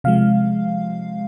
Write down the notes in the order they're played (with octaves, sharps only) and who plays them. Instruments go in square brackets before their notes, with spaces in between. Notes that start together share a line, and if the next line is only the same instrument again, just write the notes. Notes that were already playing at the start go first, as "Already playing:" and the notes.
[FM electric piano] C3 F3 G#3 F5